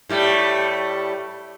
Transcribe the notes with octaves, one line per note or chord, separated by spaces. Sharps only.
A2 G3 A3